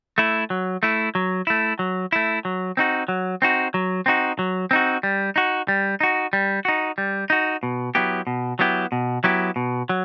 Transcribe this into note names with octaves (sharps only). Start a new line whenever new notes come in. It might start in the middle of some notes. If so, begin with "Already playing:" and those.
A3 E4
F#3
A3 E4
F#3
A3 E4
F#3
A3 E4
F#3
C4 D#4 F#4
F#3
C4 D#4 F#4
F#3
C4 D#4 F#4
F#3
C4 D#4 F#4
G3
D#4 F#4
G3
D#4 F#4
G3
D#4 F#4
G3
D#4 F#4
B2
F#3 B3 E4 G4
B2
F#3 B3 E4 G4
B2
F#3 B3 E4 G4
B2
F#3